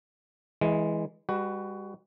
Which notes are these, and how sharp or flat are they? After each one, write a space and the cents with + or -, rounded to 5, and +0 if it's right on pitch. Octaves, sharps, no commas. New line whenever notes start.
E3 -20 G#3 +0
G3 +40 F#4 +15 B4 +0